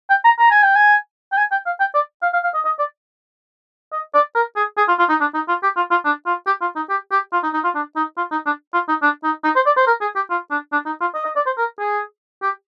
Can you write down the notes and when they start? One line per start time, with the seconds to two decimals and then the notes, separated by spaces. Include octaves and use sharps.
0.10 G5
0.24 A#5
0.39 A#5
0.51 G#5
0.63 G5
0.76 G#5
1.32 G5
1.37 G#5
1.52 G5
1.66 F5
1.80 G5
1.94 D5
2.22 F5
2.33 F5
2.44 F5
2.54 D#5
2.65 D#5
2.79 D5
3.92 D#5
4.14 D5
4.35 A#4
4.56 G#4
4.77 G#4
4.88 F4
4.99 F4
5.09 D#4
5.20 D4
5.34 D#4
5.48 F4
5.63 G4
5.76 F4
5.91 F4
6.05 D4
6.26 F4
6.47 G4
6.61 F4
6.76 D#4
6.89 G4
7.11 G4
7.32 F4
7.43 D#4
7.53 D#4
7.64 F4
7.75 D4
7.96 D#4
8.17 F4
8.31 D#4
8.46 D4
8.73 F4
8.88 D#4
9.02 D4
9.24 D#4
9.44 D#4
9.56 C5
9.66 D5
9.77 C5
9.87 A#4
10.01 G#4
10.16 G4
10.30 F4
10.50 D4
10.72 D4
10.86 D#4
11.01 F4
11.15 D#5
11.25 D#5
11.36 D5
11.46 C5
11.57 A#4
11.79 G#4
12.42 G4